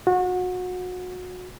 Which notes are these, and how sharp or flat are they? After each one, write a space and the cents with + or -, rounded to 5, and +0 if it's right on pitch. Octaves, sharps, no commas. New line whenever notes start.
F#4 -30